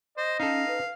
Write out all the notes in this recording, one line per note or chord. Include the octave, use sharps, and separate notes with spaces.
C5 D#5
C#4 D#4 A4 F5
B4